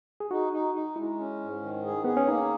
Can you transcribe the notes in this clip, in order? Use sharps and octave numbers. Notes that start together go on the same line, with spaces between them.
G#4
D#4 F#4
D#4
D#4
G#3 E4
C#4
G#2
D#3
G#4
B3 G#4
C#4
A#3 D#4